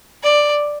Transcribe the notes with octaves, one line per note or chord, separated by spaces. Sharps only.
D5